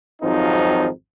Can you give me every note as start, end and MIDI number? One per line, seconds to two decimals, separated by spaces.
0.22 0.88 32
0.22 0.88 41
0.22 0.88 53
0.22 0.88 54
0.22 0.88 60
0.22 0.88 63